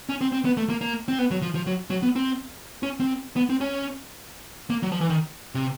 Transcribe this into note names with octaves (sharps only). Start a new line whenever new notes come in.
C#4
C4
C4
B3
A3
A#3
A#3
C4
B3
F#3
F3
F3
F#3
F#3
B3
C4
C#4
C4
B3
C4
C#4
A#3
F#3
F3
E3
D#3
C3